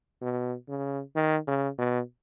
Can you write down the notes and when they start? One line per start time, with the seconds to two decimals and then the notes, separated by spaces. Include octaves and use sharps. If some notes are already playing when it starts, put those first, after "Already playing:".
0.22 B2
0.68 C#3
1.16 D#3
1.47 C#3
1.78 B2